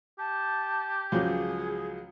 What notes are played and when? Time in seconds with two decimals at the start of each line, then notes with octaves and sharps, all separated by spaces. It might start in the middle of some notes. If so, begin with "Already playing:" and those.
0.19 G4 A5
1.12 C#2 F3 F#3 G#4